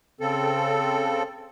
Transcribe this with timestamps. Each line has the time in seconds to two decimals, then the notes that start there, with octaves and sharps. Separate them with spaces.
0.21 C#3 C4 A4